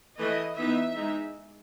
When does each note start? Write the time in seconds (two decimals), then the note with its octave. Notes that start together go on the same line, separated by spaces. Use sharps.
0.18 E3 A3 E4 D#5
0.56 E3 B3 D#4 E5
0.95 G#3 D#4